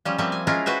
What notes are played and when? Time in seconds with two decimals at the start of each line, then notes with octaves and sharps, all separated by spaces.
0.05 F3 G3 C#4
0.18 F3 G3 A#3 C4 E5
0.32 G#5
0.47 G#3 C#4 E4 F4 A#4
0.66 F#4 B4 C5 E5